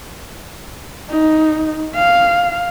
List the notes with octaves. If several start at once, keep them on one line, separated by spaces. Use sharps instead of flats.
D#4
F5